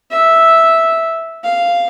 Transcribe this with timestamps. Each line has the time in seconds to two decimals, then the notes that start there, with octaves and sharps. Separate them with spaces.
0.11 E5
1.44 F5